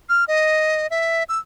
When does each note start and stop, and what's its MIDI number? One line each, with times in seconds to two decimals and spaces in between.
0.09 0.24 89
0.28 0.87 75
0.90 1.23 76
1.29 1.38 88